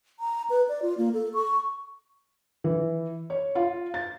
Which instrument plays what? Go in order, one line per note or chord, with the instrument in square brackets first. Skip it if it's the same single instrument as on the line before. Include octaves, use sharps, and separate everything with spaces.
[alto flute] A#5
B4
D5
F4
A#3
A4
C#6
[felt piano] E3
C#5
F4
A6